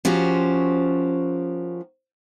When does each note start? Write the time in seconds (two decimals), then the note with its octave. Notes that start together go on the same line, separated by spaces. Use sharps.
0.05 F3 C#4 F#4 G4 A#4 C5